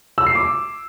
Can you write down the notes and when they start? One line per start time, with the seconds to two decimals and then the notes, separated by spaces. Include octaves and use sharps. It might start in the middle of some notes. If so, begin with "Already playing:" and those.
0.18 E6
0.26 C7
0.35 D6